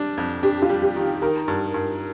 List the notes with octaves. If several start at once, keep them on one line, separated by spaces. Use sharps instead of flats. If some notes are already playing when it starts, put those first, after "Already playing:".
Already playing: G3 D4
F2
D4 G4
F4
G3
G4
D#3
D#3 A#4
G2
G2